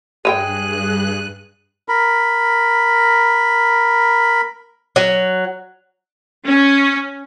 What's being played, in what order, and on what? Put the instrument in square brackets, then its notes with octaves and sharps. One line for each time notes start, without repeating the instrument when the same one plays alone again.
[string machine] G2 F#6 [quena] G#4 [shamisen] C#5 E5 G5 [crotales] D#7
[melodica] A#4 B5
[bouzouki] F#3
[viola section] C#4